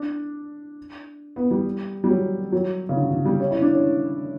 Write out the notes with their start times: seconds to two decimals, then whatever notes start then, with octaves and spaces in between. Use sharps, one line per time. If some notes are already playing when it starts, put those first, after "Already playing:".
Already playing: D4
1.36 B3
1.51 G3
2.04 G3
2.09 F#3
2.52 F#3
2.89 C#3
2.96 D3
3.11 D3
3.25 G3
3.40 C#4
3.51 E4
3.62 D4
3.73 C#4